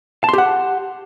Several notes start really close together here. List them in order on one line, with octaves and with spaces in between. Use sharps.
A5 C6 G4 F#5